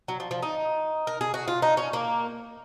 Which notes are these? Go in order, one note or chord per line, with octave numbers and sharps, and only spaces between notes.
F#3
F3
F3
D#4
A#4
G#4
F#4
F4
D#4
C#4
A#3